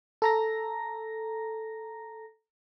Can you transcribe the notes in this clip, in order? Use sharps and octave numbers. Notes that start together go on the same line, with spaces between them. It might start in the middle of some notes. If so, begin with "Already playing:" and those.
A4 A#5 A#6